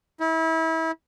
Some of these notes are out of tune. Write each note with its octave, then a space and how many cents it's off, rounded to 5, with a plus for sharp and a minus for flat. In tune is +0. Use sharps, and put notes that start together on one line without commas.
E4 -30